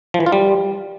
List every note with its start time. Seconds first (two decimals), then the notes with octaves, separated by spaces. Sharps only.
0.14 F3
0.20 E3
0.26 F4
0.32 G3